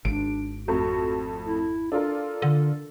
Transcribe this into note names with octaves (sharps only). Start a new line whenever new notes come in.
G#1 D4 D7
F2 A3 F#4
E4
D4 F4 A4 A#4
D3